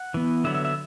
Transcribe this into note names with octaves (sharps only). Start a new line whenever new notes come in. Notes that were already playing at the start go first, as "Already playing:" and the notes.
Already playing: F#5
E3 B3
D3 F#3 B3 E5
E5
E5